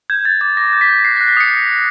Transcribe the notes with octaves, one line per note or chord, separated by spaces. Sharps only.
G6 G#6
G6 A6
D6 A6
D6 A#6
G6
B6
G6
F#6 C7
F#6 A#6
B6
D#6 C#7